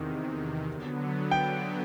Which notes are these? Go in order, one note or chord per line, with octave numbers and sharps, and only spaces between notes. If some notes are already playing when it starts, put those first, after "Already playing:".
Already playing: E2 C3 D#3
D3 F#3 B3
G5